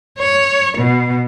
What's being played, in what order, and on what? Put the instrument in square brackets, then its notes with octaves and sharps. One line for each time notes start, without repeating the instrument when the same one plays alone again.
[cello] C#5
B2